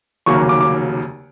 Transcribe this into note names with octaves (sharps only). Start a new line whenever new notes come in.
F1 D#2 C#3 F#3 A#3 C#6
D6
D6